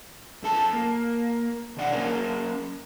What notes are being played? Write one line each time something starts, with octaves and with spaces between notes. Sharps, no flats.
F#2 A4 A5
A#3
D2 B2 D#3 D5 F#5
F#3 A#3 C#4 A#4 C#5